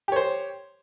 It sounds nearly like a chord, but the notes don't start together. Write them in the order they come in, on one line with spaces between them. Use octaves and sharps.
G4 C#5 C5